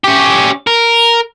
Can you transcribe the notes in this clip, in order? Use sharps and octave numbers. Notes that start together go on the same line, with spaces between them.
C#4 G4
A#4